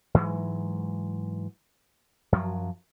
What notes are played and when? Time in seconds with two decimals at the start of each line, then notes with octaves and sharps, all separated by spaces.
0.14 G#2 E3 F#3 G#3
2.32 F#2 F3 F#3